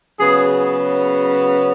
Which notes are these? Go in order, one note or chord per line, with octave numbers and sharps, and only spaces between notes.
C#3 F#3 B3 G#4
G#4